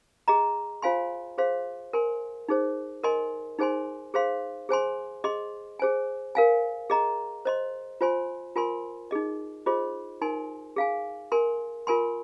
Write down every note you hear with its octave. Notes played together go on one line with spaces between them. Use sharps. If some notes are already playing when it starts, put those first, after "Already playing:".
G#4 D#5 A#5
F4 C5 F5 G#5 C6
G#4 C5 F5 C6
A#4 G#5 C6
D#4 G#4 C5
A#4 D#5 G#5 C6
D#4 G#4 C5 G#5 C6
G#4 C5 F5 C6
G#4 C5 G#5 C6
G#4 D#5 C6
G#4 C5 G#5
A#4 F5 G#5
G#4 D#5 A#5
C5 D#5 C6
F4 C5 G#5 C6
F4 A#4 G#5 C6
D#4 G#4 D#5
F4 G#4 C5 D#5 C6
D#4 A#4 G#5 C6
G#4 F5 G#5
A#4 G#5 C6
F4 A#4 G#5 C6